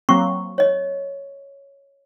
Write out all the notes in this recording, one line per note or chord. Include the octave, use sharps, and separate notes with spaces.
F#3 A#3 C4 C#6
C#5 D#5